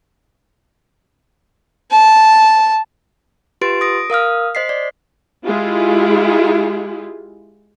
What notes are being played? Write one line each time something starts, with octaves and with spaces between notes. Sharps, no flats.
A5
F4 G4 B4 C6 A6 D7
D#6 A#6 D7
A#4 F5 D#6 F6
C5 D#5 B6 C7
D5
G#3 E4 F4 G4 G#4